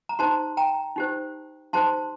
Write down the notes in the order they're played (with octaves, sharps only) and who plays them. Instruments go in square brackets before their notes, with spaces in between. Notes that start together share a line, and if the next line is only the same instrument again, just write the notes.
[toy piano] A#5
D#4 G4 C5 A5 C6
G5 A#5
D#4 G4 C5
D#4 G4 C5 A5 C6